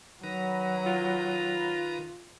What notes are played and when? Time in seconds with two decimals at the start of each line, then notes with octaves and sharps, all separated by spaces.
0.24 D#3 F#3 B4 A#5
0.86 F4